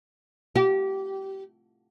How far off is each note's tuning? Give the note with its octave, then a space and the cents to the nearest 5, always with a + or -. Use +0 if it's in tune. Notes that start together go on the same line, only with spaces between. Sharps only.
G4 -20